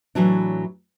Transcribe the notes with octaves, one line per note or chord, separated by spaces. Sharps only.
A2 E3 F#3 D4